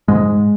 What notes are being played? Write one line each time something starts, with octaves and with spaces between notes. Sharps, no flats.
G#2 G#3